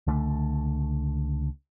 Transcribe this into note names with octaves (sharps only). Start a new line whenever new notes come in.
C#2 D3 A3